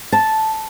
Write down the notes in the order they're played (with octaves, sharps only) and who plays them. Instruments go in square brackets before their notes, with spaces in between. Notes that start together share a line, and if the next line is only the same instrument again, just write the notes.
[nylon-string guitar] A5